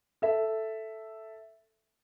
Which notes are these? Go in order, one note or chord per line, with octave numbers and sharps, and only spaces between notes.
A4 E5